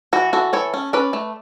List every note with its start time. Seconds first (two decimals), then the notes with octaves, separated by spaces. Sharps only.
0.13 E3 F#4
0.33 E3 F#4 A4
0.53 E3 A4 C#5
0.74 C#4
0.93 C#4 B4 D5
1.13 A3